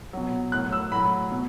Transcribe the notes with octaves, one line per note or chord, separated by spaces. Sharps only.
B2 F#3
A2 F#3 F#6
E6
A2 F#3 B5
B2